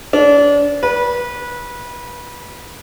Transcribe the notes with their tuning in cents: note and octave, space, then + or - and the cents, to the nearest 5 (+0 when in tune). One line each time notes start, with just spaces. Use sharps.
D4 -30
B4 -25